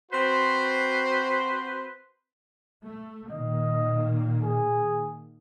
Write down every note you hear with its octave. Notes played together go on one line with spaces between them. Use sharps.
C4 F#4 B4 C5
A3
A#2 D#3 A#3 D#5
G#4